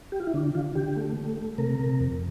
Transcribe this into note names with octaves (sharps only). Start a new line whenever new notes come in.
G4
F4
E4
D3 D4
D3 F4
D3 G4
A3
A3
A3
C3 A#4
C3
F2